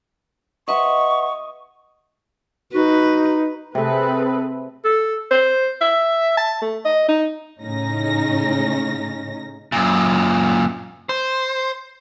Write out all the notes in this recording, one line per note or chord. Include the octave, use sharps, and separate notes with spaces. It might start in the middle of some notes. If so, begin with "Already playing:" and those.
B4 D#5 E5 F#5 C6 C#6
D#4 F#4 B4
C3 A3 C4 G#4 A4 B4
A4
C5
E5
A5
A3
D#5
D#4
A2 C#3 C#4 D#4 A#6
F#2 A#2
C5